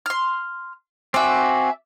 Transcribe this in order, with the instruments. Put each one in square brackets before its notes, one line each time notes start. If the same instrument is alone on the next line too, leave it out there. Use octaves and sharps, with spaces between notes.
[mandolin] C6 F6
[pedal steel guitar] C4 F#4 [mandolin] D5 E5 [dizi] G#5